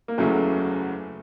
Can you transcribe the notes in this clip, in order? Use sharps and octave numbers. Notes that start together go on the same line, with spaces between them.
A#3
F#1 E2 C#3 F#3 A3